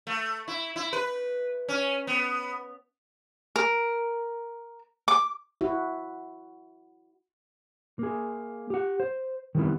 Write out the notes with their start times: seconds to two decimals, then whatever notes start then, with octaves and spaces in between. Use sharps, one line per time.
0.07 A3
0.48 E4
0.76 E4
0.93 B4
1.68 C#4
2.07 B3
3.56 A#4
5.08 D6
5.61 E4 F#4
7.99 A#3 G#4
8.70 G4 F#5
9.00 C5
9.55 D#3 G3 B3 C4 E4